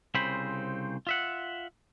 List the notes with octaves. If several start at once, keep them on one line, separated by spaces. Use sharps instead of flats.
C2 C#3 C4 C5 B5
F4 E5 F#5